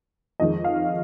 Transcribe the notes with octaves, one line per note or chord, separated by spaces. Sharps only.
F2 D#3 G#3 D#5
F5